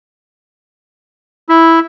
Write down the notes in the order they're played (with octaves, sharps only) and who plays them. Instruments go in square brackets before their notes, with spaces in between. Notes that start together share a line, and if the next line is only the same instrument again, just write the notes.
[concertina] E4